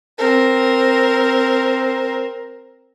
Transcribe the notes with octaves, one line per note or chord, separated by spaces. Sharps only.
C4 A#4